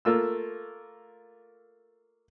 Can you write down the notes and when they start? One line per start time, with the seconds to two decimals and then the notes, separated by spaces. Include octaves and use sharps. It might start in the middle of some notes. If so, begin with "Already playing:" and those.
0.05 A3 A#3 F4 E6